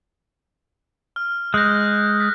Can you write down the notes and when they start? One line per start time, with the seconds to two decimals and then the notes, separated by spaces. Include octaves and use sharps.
1.16 F6
1.54 G#3 F#6 G6 A#6
2.20 F#6 A6 B6